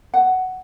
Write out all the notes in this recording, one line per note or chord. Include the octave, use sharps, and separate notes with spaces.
F#5